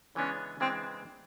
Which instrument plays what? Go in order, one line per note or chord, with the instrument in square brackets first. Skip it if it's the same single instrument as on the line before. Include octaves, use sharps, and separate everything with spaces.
[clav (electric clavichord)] C#3 E3 G#3 B3 D4 [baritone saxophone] C#4
[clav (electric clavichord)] C#3 E3 G#3 B3 D4 [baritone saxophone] C4